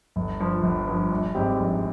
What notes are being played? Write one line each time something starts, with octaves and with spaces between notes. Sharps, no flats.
G1
G2 F3
G1
G2 F3
A#1
G#2 G3 C4 G4
A#1